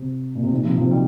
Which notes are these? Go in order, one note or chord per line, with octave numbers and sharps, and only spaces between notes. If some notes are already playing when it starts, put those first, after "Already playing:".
Already playing: C3
A#2
C3
A#2 D#3
C3 F3
C3 F3
D#3 G3